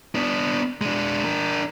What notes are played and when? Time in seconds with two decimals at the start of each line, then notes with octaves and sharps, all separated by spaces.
0.15 B3 D4
0.81 G#3 D4
1.25 D4 A#4